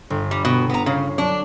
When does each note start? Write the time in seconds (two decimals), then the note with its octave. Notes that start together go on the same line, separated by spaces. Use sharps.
0.10 G1
0.31 G3
0.45 B2
0.70 B3 A#5
0.86 C#3 C#5 C7
1.18 F#3 D4